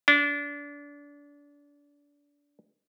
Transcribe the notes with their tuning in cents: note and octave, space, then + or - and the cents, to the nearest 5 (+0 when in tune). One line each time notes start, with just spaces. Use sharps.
D4 -30